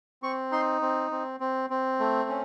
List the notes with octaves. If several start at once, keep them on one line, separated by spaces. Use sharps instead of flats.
C4 C#6
D#4 C6
C4
C4
C4
C4
A3
C#4